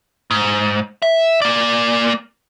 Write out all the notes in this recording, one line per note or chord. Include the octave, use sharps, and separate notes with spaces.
G#2
E5
A#3 D5